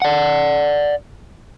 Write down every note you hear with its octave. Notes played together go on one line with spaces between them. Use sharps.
D5 F#5